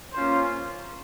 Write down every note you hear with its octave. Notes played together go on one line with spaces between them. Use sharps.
A#3 C#4 F4 C5